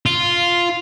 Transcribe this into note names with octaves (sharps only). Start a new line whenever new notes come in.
F4